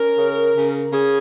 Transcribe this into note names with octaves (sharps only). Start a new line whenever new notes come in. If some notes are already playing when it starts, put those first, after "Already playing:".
Already playing: C#4 A#4
C#3
C#3
C#3 G#4